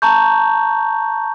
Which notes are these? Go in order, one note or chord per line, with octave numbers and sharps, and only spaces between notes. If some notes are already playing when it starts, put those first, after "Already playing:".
A5 A#5 C#6 G6